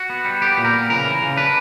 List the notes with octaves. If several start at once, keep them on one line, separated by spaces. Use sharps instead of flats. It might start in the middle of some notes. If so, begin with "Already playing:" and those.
Already playing: F#4
B3
G3
B3 G4
A#2
A#4
B3
C#3 A#4
E3
C#3
D4 B4